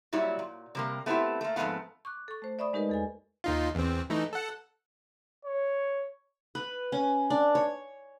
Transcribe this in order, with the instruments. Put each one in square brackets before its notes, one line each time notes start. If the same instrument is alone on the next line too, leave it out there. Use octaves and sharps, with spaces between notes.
[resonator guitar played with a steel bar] A#2 F#3 G3 E4
A#2
C3 G3 A#3
A3 B3 C4 D#4 E4 G4
A3 A#3
F2 G#2 E3 A3 B3 F5
[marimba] C#6 D6 F#6
A4 C#6
A3 C5
D5 E5 B5 C#6 D#6
G#3 D#4 G4 A#4 B4 D#5
E2 A4 G#5
[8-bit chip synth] D#2 D#4 F4
E2 C4
E3 A3 D#4
A4 F#5
[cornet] C#5
[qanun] B4
C#4
D4
C#5